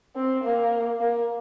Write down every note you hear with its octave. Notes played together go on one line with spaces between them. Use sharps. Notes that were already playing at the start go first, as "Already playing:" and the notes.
C4
A#3
A#3